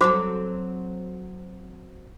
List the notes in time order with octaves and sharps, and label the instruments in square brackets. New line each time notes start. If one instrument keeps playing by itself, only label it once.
[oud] F#3 C4 A4 [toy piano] F#4 C5 D6